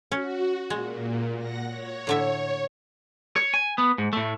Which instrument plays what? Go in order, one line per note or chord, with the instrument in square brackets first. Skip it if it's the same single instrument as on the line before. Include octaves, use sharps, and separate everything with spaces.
[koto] C#4 [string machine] F#4
[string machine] A#2 [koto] G#3
[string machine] F#5 A#6
C#5
[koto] A2 D3 E5
[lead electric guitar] C#5
G#5
B3
G#2
A2 A3